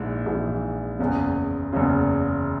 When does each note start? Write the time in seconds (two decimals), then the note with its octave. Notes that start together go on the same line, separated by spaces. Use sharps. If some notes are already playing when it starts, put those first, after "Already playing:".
Already playing: A#1 G#2 E3
0.26 A#1 G#2 E3
0.99 F#1 E2 C#3
1.73 F#1 E2 C#3